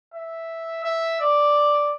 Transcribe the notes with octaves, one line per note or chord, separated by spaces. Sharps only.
E5
E5
D5